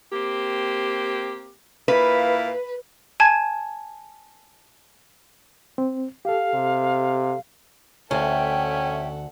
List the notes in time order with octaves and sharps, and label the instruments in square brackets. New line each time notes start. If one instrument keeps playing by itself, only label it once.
[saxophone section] A#3 C4 G4
[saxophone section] A#2 E4 F5 [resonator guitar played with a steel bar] B4
[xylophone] G#5 A5 G#6
[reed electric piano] C4
[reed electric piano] G4 A4 [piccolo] F5
[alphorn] C3
[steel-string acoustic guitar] D2 [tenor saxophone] C#4 [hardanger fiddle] A4 F#5 [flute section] E5 G5